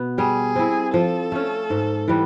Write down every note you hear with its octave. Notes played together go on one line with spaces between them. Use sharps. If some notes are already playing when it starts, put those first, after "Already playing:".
Already playing: B2 B3
G3 G#4
C4 E4
F3 A4
A3 C#4
G#2
E3 G3 B3